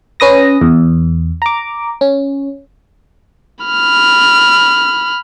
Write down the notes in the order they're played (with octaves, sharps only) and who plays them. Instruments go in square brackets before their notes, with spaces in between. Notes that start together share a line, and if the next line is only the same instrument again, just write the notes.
[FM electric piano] C#4 B4 D#6 A#6
E2
A#5 D6
C#4
[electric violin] B5 F6